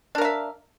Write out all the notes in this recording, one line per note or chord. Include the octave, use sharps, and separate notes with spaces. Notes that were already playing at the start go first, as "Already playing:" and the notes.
D4 A#4 E5 F5